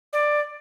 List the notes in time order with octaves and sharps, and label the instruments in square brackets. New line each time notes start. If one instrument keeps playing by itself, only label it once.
[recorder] D5